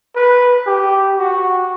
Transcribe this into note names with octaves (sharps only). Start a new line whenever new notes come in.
B4
G4
F#4